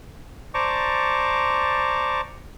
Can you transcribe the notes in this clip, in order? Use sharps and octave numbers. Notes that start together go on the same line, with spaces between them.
C5 D5 A5 A#5 C#6 D6